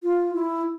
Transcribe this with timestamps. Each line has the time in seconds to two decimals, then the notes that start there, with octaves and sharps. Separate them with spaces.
0.03 F4
0.34 E4